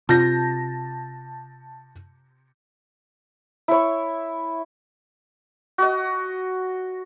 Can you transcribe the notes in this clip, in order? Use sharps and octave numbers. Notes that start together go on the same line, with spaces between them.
C3 F4 A5 G6 A#6
E4 C#5
F#4 D#5